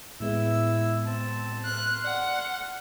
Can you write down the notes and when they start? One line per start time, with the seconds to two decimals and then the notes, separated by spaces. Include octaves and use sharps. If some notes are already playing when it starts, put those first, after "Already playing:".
0.20 A2 G#3 B3 E4 E6
1.05 C4 A5
1.64 C6 F6 F#6
2.04 D5 F#5 F#6